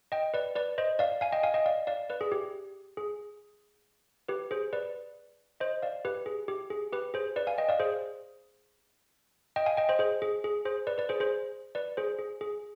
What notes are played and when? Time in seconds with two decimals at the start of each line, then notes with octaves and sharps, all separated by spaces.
0.12 D#5 G5
0.34 B4 D5
0.56 B4 D5
0.78 C5 D#5
0.99 D5 F5
1.21 F5 G#5
1.32 D#5 G5
1.43 F5 G#5
1.54 D#5 G5
1.66 D5 F5
1.87 D5 F5
2.10 B4 D5
2.21 G#4
2.32 G4
2.97 G#4
4.28 G4 B4
4.51 G#4 C5
4.73 B4 D5
5.60 C5 D#5
5.82 D5 F5
6.05 G4 B4
6.26 G#4
6.48 G4
6.70 G#4
6.92 G4 B4
7.14 G#4 C5
7.36 B4 D5
7.47 F5 G#5
7.58 D#5 G5
7.69 D5 F5
7.80 G#4 C5
9.56 D#5 G5
9.66 F5 G#5
9.77 D#5 G5
9.89 C5 D#5
9.99 G#4 C5
10.22 G#4
10.44 G#4
10.65 G#4 C5
10.87 B4 D5
10.98 B4 D5
11.09 G#4 C5
11.20 G#4 C5
11.75 B4 D5
11.97 G#4 C5
12.19 G#4
12.41 G#4